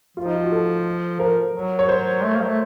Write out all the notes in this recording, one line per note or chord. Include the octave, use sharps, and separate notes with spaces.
F3 F4
D#4
F4
F#4
A4
F3 A#4
F#3
C#5
C5
A3
A#3
F#3
A3